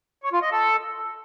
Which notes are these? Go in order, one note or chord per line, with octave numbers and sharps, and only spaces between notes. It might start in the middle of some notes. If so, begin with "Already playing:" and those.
C#5
F4
D#5
A4